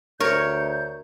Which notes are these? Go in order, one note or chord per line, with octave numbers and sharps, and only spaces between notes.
D2 A#4 C#5 G6